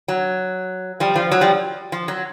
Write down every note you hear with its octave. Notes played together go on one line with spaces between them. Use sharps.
F#3
F3 G3
F3
F#3
F3 G3
F3
F#3